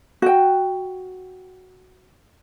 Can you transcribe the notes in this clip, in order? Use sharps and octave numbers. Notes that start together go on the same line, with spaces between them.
F#4 G5